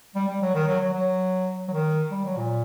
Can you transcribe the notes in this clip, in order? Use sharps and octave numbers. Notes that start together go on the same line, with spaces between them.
G3
G3
F#3
D#3
F#3
F#3
F#3
F#3
D#3
G3
F#3
A#2